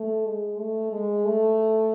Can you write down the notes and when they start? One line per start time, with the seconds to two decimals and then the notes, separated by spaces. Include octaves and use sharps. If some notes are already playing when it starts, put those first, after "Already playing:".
Already playing: A3
0.26 G#3
0.58 A3
0.92 G#3
1.25 A3